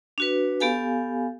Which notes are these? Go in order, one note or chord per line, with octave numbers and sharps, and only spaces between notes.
D4 F#4 B4
B3 G4 A4 F5 G#5